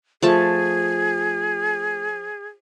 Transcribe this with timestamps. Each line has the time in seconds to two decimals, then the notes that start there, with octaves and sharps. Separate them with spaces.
0.22 F3 A3 G#4 A5